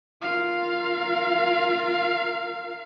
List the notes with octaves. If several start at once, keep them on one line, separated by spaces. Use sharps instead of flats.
F4 A#4 F5